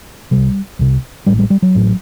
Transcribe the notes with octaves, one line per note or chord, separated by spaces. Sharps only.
C2 C3 G3
C2 C3
A1 A2 G3
G3
G3
F#3
A1 A2